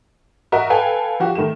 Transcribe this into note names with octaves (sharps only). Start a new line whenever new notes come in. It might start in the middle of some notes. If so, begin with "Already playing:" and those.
F#4 A#4 D#5 E5
A4 B4 F5 G5 G#5
F3 F#4 G4
D#3 A3 E7